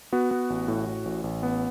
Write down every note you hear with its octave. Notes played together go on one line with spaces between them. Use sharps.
B3 F#4
B3
A1
A2
A2
A1
A1
B3